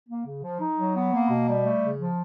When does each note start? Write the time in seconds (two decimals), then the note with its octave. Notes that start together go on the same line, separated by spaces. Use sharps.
0.09 A#3
0.26 C#3
0.44 F3
0.60 D#4
0.78 F#3
0.96 B3
1.13 A#3
1.30 B2
1.48 G3
1.65 A3
1.82 C#3
1.98 F3